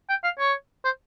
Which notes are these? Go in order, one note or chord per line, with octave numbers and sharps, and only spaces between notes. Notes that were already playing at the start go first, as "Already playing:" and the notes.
G5
F5
C#5
C5